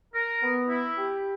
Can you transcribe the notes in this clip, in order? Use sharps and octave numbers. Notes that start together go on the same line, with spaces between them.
A#4
B3
E4
G4